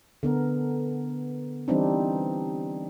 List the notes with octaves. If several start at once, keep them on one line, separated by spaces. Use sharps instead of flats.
D3 B3 A#4
E3 G3 C4 D4 D#4